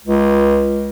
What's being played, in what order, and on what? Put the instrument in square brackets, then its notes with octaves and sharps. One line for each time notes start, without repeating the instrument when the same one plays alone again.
[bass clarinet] C#2